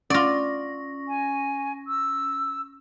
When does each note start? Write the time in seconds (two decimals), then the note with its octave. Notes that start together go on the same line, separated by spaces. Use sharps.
0.10 C#4 F4 D5 C#6 A#6
1.08 G#5
1.87 E6